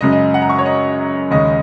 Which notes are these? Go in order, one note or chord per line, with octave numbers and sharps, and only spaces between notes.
F#2 C#3 G#3 D#5
D#5
F#5
A#5
C#6
C#5
D#5
D#2 C#3 G#3 C#4 D#5